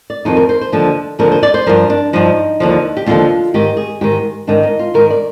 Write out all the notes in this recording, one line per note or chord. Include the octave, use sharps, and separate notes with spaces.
D5
F2 D#3 D#4
A#4
C5
C5
D#2 D3 F3
D#2 D3 F3 A#4
C5
D5
C5
G2 F3 A#4
D4
G2 F3 D#4
D#2 D3 F3
G4
D#2 D3 F3 F4
G#2 D#3 G4
G#4
G#2 D#3 G4
G#2 D#3 D4
D#4
F4
G#2 D#3 A#4
D5